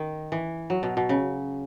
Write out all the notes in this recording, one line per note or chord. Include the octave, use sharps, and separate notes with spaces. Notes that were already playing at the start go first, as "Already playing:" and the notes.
Already playing: D#3
E3
F#3
B2
B2
C#3